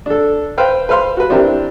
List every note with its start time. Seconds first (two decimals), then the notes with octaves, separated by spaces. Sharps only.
0.06 D4 A4
0.58 B4 C5 F5 G5
0.89 B4 C5 F5 C6
1.17 F#4 B4
1.30 C4 D4 E4 G4 A#4